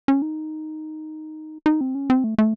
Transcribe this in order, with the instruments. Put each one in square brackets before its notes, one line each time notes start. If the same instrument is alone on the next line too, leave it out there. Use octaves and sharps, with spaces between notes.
[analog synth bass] C#4
D#4
D#4
C4
C#4
C4
A3
A3